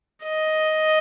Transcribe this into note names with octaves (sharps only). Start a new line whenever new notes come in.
D#5